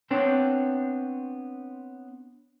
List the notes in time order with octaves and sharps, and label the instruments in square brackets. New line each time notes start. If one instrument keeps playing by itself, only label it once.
[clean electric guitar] B3 C4 D4 C#5 G5